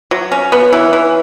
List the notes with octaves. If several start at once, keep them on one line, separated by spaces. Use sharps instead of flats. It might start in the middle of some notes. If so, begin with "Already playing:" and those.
F#3
C#4
B3
E3
E3